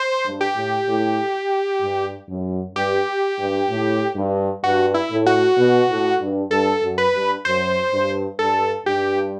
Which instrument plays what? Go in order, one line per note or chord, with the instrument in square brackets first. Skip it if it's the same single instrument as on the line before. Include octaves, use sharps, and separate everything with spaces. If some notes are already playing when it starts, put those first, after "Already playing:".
Already playing: [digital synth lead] C5
[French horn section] G2
[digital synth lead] G4
[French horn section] A2
A2
G2
F#2
[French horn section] G2 [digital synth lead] G4
[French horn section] G2
A2
G2
[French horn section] G2 [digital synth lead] F#4
[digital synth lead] E4
[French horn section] A2
[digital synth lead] F#4
[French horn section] B2
A2
G2
[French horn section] G2 [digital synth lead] A4
[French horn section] F#2
[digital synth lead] B4
[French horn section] G2
[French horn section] F#2 [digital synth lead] C5
[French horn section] G2
[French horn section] G2 [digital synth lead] A4
[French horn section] G2 [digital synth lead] G4